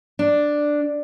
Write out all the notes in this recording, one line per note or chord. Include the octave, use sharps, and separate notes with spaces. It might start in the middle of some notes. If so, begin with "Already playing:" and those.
D4